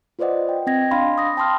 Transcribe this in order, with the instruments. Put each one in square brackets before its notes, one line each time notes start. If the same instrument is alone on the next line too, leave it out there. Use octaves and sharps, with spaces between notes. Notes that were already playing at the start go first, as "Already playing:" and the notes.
[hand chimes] F4 B4 C5 D5 D#5 F#5
G5
C4 D#5 G5 G#6 A#6
D4 D#5 F5 B5 C6
D#6 A#6
G5 A5 B5 C6 D#6 F6